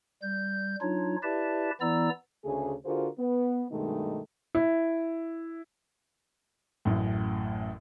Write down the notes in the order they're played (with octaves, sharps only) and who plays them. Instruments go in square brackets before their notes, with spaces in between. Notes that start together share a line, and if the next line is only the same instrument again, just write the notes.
[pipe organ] G3 G6
F#3 D4 D#4 F4 C#5
E4 G4 B4 D5 E5 A5
E3 B3 E4 D5 A#5 E6
[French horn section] D2 C#3 A3 G#4
D3 F4 F#4 G#4 A#4 C5
B3
G2 B2 D#3 G#3 A3 D#4
[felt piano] E4
[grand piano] A1 F#2 A2